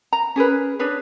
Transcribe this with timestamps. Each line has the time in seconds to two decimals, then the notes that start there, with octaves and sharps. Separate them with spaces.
0.13 A#5
0.36 C#4 G#4 A#4 B4
0.79 D4 G#4 B4 C#5